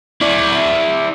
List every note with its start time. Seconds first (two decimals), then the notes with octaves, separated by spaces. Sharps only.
0.22 E4 D5